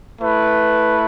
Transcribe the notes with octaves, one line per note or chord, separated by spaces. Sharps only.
A3 E4 B4